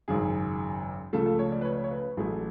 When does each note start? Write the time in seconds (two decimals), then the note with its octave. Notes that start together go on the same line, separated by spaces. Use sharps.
0.08 G#1 F#2 C#3 G#4
1.13 C#2 C#3 F3 A3 A4
1.26 A4
1.39 C#5
1.52 D5
1.61 B4
1.65 C#5
1.84 C#5
1.91 B4
2.17 A1 A2 F#3 A3 G#4